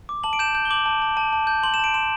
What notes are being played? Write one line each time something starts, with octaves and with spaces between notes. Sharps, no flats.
D6
A5 F#7
D7
G6 E7
G6
G7
D6 F#7
A5
A5
A5
A5
G6
C6 F#7
E7
A5 D7
C6 E7